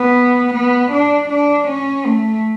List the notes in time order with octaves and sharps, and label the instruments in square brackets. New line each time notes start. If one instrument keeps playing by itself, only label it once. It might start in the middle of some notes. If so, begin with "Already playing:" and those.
Already playing: [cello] B3
B3
D4
D4
C#4
A3